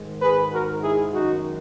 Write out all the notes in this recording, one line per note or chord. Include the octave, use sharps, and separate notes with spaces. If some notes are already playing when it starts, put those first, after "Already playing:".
Already playing: G#2 D#3 G#3
G#4 B4
F#4 A#4
E4 G#4
F#2 D#3 G#3 D#4 F#4